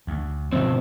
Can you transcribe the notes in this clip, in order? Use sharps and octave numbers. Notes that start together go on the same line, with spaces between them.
D2
G2 B2 D3 F3 C4